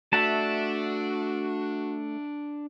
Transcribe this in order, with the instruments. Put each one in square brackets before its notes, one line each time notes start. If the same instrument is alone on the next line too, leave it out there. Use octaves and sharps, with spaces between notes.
[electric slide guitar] A3 [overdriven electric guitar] D4 [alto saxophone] F#4 [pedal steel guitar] E5 F#5 A5